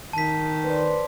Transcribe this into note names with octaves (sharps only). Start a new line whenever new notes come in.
D#3 A5 B6
B4 C5 D5